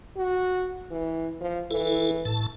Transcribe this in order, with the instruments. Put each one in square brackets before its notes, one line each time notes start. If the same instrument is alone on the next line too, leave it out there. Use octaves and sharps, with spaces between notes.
[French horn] F#4
E3
F3
[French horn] E3 [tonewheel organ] E4 A4
[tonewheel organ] A2 A5